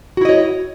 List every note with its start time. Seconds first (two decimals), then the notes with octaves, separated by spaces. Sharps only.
0.17 F#4
0.21 E4
0.25 D#5
0.29 C#5